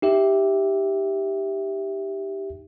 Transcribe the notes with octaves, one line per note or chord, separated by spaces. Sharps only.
D#4 G4 E5